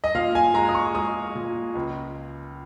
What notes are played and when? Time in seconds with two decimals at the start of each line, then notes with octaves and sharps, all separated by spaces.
0.04 D#5
0.14 A#2 F5
0.35 G#5
0.54 G#3 A#5
0.69 D#6
0.75 C#6
0.95 G#3 D#6
1.35 A#2
1.75 C#2